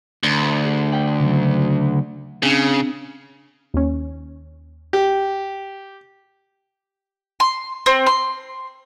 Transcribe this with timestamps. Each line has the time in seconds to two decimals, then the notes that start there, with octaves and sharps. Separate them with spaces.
0.23 D2
0.65 G#4
0.92 D5 G5
1.20 C#3 F#3
2.43 C#3 C4 D4 G#5
3.74 D#2 C#4
4.93 G4
7.40 C6
7.86 C4
8.07 C6